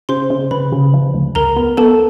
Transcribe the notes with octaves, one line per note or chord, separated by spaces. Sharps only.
C#3 C5 C6
C#3
C#3 B4 B5
C#3
F3
D2
C#2 A#4 A#5
B3
B3 A4 A5